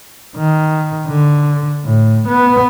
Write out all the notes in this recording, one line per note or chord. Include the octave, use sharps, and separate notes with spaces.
D#3
D3
A2
B3